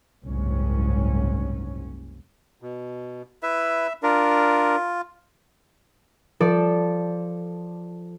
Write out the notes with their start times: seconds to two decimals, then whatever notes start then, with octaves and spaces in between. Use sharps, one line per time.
0.23 F#1 C2 G#2 C#4
2.62 B2
3.43 E4 B4 E5
4.03 D4 F4 A#4
6.40 F3 A4 D5